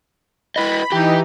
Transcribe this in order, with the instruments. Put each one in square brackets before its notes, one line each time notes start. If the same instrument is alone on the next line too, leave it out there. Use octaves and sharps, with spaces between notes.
[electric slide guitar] E4 B4 D#5 [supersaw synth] B5
[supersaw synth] E3 D#4 [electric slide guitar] G4 G5